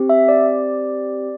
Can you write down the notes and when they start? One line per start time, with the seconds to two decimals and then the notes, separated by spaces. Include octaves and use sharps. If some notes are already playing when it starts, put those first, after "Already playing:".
Already playing: C4 G4
0.09 E5
0.28 D5